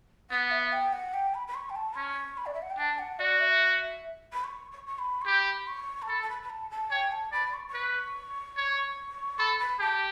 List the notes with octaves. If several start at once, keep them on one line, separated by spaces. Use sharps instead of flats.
B3 F#5
E5
G5
F#5
G5
B5
B5
C#6
G5
A5
C#4 C#6
B5
D5
E5
F#5
G5
D4 A5
F#5
F#4 D5
E5
B5
C#6
C#6
C#6
B5
C#6
G4 B5
C#6
A5
A4 B5
A5
B5
B5
A5
A5
C#5 G5
A5
D5 B5
C#6
C#6
B4
C#5
A4 B5
B5
G4 A5